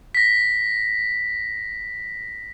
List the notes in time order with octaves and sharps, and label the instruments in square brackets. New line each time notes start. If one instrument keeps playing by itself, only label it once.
[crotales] A#6 B6